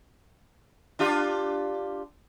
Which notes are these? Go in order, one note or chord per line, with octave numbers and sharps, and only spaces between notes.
D4 F4 G4